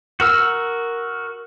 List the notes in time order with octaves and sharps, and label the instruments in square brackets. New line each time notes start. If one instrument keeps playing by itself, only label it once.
[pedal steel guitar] F#4 A#4 E6